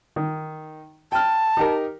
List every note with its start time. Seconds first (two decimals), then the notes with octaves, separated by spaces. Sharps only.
0.16 D#3
1.12 G5 A5 F6
1.57 D#4 G4 A#4